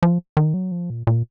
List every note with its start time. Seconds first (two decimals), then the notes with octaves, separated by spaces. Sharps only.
0.03 F3
0.37 D#3
0.54 F#3
0.71 F3
0.90 A#2
1.07 A#2